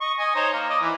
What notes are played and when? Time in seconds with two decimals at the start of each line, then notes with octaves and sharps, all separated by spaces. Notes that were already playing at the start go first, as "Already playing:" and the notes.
0.01 D#5 C#6
0.18 D#5 G#5
0.36 D#4 C5 C#5
0.53 A#3
0.69 D5 D#5
0.82 E3